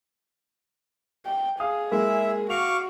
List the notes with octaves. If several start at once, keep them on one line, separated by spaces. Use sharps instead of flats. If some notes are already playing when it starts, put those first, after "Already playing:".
G5
G#4 F5 D#6
G#3 A#3 E4 E5
F#4 F5 C#6 D6 F7